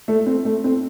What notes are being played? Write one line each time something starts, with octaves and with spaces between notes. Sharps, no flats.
A3
C4
A3
C4